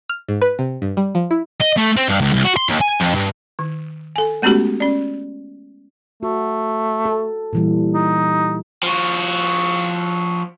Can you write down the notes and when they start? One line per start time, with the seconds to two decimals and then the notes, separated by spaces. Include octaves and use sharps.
0.09 F6
0.29 G#2
0.42 B4
0.59 C3
0.82 G2
0.97 G3
1.15 F3
1.31 E4
1.61 D#5
1.77 A3
1.97 C4
2.09 G2
2.21 C#2
2.33 C2
2.44 F#4
2.57 C6
2.69 D#2
2.81 G#5
3.01 F2
3.15 G2
3.59 D#3
4.16 A4 G#5
4.42 G#3 A3 B3 C#4 F#4 G4
4.80 C#4 D5
6.23 A3 F#4
7.06 A4
7.53 A#2 E3 G3
7.94 D#4
8.83 F3 F#4